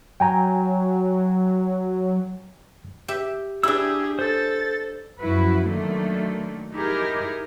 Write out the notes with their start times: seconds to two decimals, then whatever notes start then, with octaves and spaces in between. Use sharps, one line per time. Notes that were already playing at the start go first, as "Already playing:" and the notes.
0.20 F#3 G5 G#5 A#5
3.08 G4 E5
3.63 D4 E4 G4 G#4 E6
4.19 A4 C5 A6
5.20 F#2 F3 E4 F#4 B4
5.65 D3 D#3 F#3 A3 A#3
6.73 D#4 E4 G4 G#4 A#4